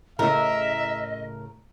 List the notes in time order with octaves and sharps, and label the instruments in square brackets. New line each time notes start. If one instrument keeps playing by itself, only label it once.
[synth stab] A2 C#3 A3 [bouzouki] A#4 [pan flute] D#5 [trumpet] E5